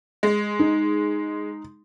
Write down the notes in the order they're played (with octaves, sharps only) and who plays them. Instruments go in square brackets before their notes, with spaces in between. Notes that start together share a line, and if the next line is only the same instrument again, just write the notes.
[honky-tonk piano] G#3
[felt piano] D#4